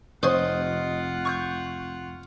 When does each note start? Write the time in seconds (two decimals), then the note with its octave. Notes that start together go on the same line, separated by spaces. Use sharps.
0.23 F1 F4 C5 C#5 D#5 F#5 C6
1.25 C#6 F#6 G6